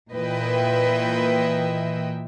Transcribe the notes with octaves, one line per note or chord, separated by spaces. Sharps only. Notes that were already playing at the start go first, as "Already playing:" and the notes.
A#2 E3 B4 D#5 E5 G5